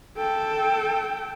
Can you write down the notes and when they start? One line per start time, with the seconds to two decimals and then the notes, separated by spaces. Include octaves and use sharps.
0.18 A4 G5